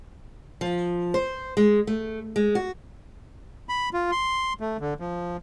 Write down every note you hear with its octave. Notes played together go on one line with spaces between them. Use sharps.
F3
C5
G#3
A3
G#3
F#4
B5
F4
C6
A3
D3
F3